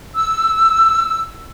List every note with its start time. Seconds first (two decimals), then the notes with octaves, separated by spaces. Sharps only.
0.15 E6